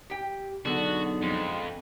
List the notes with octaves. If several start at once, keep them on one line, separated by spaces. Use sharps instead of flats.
G4 G5
B1 D3 B3 F#4 G#4
F2 G#3